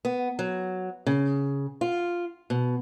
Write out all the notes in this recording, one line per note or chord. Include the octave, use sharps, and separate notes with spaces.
B3
F#3
C#3
F4
B2